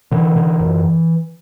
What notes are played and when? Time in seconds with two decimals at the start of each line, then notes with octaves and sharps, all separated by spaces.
0.11 D3 E3
0.36 D3
0.60 F#2